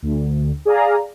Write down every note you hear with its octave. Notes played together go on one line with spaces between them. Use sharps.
D2
G#4 D5 F5 A#5